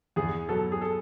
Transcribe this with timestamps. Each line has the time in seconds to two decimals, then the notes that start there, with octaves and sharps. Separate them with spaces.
0.16 E2 G#4
0.48 B2 F#3 A4
0.72 G#4
0.82 A4